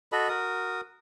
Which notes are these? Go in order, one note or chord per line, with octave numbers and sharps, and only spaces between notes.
F#4 A4 D#5 B5
F#4 A#4 D#6